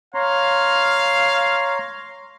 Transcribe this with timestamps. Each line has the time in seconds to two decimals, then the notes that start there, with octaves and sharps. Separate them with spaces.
0.15 C#5 F5 A#5 C6